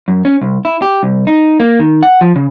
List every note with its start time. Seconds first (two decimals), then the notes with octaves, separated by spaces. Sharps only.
0.08 F#2
0.25 C#4
0.41 C2
0.65 E4
0.82 G4
1.03 C2
1.27 D#4
1.60 A#3
1.79 D#3
2.03 F#5
2.21 F3
2.36 C#3